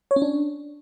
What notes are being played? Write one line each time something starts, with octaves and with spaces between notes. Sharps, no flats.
C#5
C#4
D4